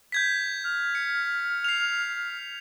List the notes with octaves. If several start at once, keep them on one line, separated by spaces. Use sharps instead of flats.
G6 G#6 B6
F6
C#7
C7 F7